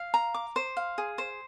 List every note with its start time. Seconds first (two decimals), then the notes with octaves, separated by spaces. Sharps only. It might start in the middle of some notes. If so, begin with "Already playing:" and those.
Already playing: F5
0.14 A#5
0.34 D6
0.56 C5
0.77 F5
0.98 G#4
1.18 C5